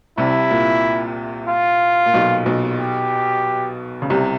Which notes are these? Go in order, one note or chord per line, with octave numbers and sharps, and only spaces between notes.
C2 C3 E4
A#2
F4
A#2
B1 B2
B1 B2
G4
C#3
C2 C3